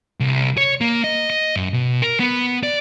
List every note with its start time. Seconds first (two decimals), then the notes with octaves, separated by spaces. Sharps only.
0.20 C2
0.57 C#5
0.81 A#3
1.04 D#5
1.30 D#5
1.56 F#2
1.74 B2
2.02 A#4
2.20 B3
2.63 D5